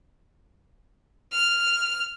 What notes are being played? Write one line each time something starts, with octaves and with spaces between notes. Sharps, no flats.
F6